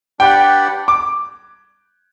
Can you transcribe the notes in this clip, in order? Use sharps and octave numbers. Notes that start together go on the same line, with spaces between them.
D4 G4 B4 D5 F#5 G5
D6